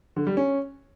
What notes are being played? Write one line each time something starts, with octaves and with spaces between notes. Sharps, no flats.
D3
G3
C#4